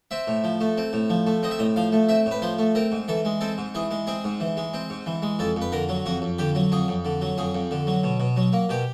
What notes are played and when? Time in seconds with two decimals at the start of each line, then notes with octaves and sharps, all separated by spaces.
0.11 C4 E5
0.28 A2
0.44 F3
0.61 A3
0.78 C4
0.93 A2
1.10 F3
1.27 A3
1.43 C4 D#5
1.51 E5
1.59 A2 D#5
1.76 F3 F5
1.92 A3
2.09 C4 E5
2.26 A2
2.31 B4
2.42 F3 C5
2.59 A3
2.75 C4 A#4
2.92 G#2
3.08 E3 A4
3.25 G#3
3.41 C4 A4
3.58 G#2
3.75 E3 G#4
3.91 G#3
4.07 C4 G#4
4.24 G#2
4.40 E3
4.57 G#3
4.74 C4
4.90 G#2
5.06 E3
5.22 G#3
5.39 F2 A4
5.56 F2
5.62 B4
5.72 D3 A#4
5.89 F#3
6.06 F2 F#4
6.22 F2
6.38 D3 G4
6.55 F#3
6.72 F2 G#4
6.88 F2
7.05 D3
7.21 F#3
7.38 F2 G#4
7.55 F2
7.71 D3
7.87 F#3
8.04 B2
8.20 B2
8.37 F#3
8.53 A#3
8.69 B2 G4